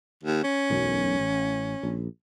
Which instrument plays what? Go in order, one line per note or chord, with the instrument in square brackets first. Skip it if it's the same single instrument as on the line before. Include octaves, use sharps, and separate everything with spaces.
[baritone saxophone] D#2
C#4
[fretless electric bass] E1 B1 F#2
A1
A#1